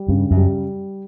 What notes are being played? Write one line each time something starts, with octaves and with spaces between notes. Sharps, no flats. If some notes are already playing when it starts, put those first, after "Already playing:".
Already playing: G3
G2 C#3
F#2
G3